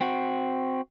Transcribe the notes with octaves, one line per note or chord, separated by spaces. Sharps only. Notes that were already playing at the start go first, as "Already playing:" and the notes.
C4 F#4